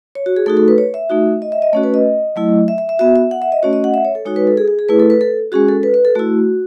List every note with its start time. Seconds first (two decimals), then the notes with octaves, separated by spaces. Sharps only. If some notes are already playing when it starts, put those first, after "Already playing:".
0.15 C#5
0.26 F#4
0.36 G#4
0.46 A3 D#4 F#4 A4
0.57 A4
0.68 B4
0.78 C#5
0.94 E5
1.10 A3 D#4 F#4
1.42 D#5
1.52 E5
1.62 D#5
1.73 A3 C#4 F#4 C#5
1.84 B4
1.94 D#5
2.36 F#3 A3 E4
2.68 E5
2.78 E5
2.89 E5
2.99 B3 F#4 E5
3.16 E5
3.31 F#5
3.42 E5
3.52 D#5
3.63 A3 C#4 F#4 C#5
3.73 D#5
3.84 F#5
3.94 E5
4.05 C#5
4.15 A4
4.25 G#3 D#4 F#4 C#5
4.36 B4
4.47 A4
4.57 G#4
4.68 G#4
4.79 G#4
4.89 A3 E4 B4
5.00 A4
5.10 B4
5.21 A4
5.52 G#3 C#4 F#4 G#4
5.68 A4
5.83 B4
5.94 B4
6.05 A4
6.15 A3 E4 F#4